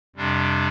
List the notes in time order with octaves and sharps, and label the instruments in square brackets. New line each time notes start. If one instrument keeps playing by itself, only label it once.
[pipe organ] F2 C3 G3 D4